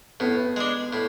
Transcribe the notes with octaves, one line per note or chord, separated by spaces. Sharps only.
A2 B3
G#3 D4
A2